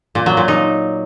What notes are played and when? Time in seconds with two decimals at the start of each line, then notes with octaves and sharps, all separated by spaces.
0.15 A#2
0.26 F#3
0.37 A#2
0.48 D#4